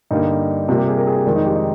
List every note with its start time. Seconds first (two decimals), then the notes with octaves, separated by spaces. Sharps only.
0.11 G2 D3 G3 A#3 D#4
0.69 C3 G3 A#3 F4
0.78 G4
0.87 G#4
0.97 A#4
1.07 G#4
1.16 G4
1.26 F2 D#3 G#3 D4
1.36 D#4
1.46 G4
1.55 D#4